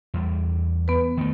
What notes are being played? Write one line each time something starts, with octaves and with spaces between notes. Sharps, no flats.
E2 G3
B3 B4
D#3 A3